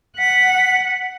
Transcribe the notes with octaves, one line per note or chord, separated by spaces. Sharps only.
F#5 B6